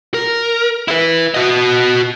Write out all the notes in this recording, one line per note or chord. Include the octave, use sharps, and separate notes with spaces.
A#4
E4 B4
F#4 D#5